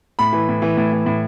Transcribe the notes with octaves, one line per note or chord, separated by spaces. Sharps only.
A2 B5
E3
A2
E3
A2
E3
A2